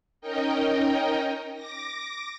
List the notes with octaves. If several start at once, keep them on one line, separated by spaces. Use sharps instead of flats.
C#4 D#4 A#4 D#5 G5
D6 A#6